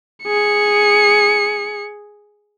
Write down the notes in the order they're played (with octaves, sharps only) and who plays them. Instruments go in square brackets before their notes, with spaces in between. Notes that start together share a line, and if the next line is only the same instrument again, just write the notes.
[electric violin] G#4 C#7